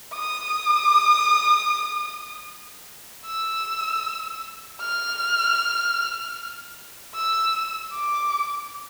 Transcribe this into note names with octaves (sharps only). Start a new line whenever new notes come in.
D#6
E6
F6
E6
D6